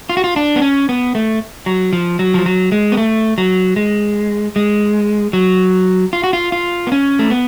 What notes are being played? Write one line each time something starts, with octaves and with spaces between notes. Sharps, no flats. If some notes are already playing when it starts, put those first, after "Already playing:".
F4
F#4
F4
D4
B3
C#4
B3
A3
F#3
F3
F#3
F3
F#3
G#3
B3
A3
F#3
G#3
G#3
F#3
F4
F#4
F4
F4
B3
C#4
A3
B3